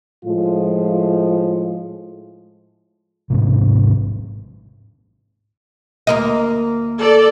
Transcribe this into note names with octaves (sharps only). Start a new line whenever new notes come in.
A2 F3 G#3 F4
A1 G#2 C3
D2 A#3 D#5
A4 D5